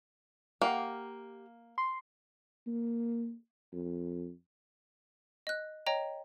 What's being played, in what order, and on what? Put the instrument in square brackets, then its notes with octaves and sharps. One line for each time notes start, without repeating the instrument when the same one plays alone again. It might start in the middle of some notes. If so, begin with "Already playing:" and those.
[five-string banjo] A#3 [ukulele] G4 F5 F#5
[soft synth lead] C6
[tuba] A#3
F2
[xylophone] D#5 F#6
C#5 D#5 G5 A#5